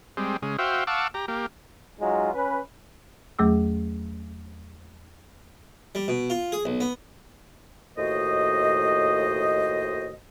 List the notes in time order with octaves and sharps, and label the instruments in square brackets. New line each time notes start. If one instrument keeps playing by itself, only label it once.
[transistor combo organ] G3 G#3 C4
C#3 G#3
F#4 C5 E5 F5 G5
F5 F#5 A5 C#6 D6 E6
G4 A#5
A#3 G4
[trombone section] F#3 G#3 D#4 F4
C#4 B4
[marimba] E2 F#3 A3 G#4 D6 E6
[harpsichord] G3
B2
F4
G#4
B1
B3
[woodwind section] D#2 A2 F#4 C5 D#5